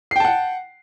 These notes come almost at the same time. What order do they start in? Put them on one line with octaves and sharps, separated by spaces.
C7 G5 A5 F#5